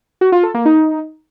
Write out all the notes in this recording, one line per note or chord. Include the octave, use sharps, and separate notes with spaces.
F#4
F4
A4
A#3
D#4